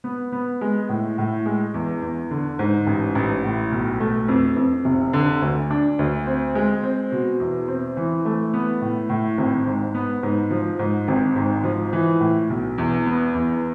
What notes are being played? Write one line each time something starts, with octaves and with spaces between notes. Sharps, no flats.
B3
B3
G#3
A2
A2
G#3
E2
E2
D3
G#2
A1
A1
A2
B1
A3
F2
F2
F1
D3
D2
D4
D2
C4
G#3
C4
B2
E2
C4
E3
A3
B3
A2
A2
G#1
G#2
B3
G#2
F3
G#2
G#1
G#2
F3
E3
A2
B1
E2
B3
E2